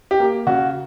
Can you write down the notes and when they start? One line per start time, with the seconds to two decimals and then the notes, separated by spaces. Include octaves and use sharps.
0.11 G4
0.20 A#3
0.47 C#3 F#4